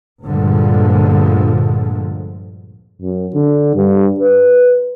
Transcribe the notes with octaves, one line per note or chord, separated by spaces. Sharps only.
D2 G2 A#2 D3 F3 G#3
F#2
D3
G2
B4